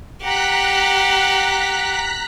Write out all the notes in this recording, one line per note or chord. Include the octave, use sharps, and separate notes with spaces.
G4 F#5 A#5 F#6 B6